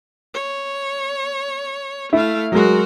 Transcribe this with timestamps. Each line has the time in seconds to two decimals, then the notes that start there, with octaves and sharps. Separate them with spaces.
0.34 C#5
2.13 A3 E4 F5
2.52 F#3 G#3 F#4 A#4